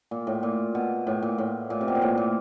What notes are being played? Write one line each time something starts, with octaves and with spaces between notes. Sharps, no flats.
A#2
A2
A#2
B2
A2
A#2
A2
A#2
C3
B2
A#2
A2
A#2